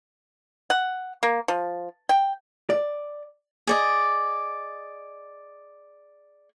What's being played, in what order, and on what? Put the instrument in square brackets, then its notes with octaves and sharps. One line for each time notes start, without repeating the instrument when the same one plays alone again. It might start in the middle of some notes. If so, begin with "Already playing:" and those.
[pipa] F#5
A#3
F3
G5
[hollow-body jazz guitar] D5
[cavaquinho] G#4 D5 D#5